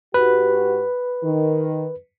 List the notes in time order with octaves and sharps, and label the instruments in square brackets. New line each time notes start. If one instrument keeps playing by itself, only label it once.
[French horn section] G#2 F#4 G4 [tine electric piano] B4
[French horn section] D#3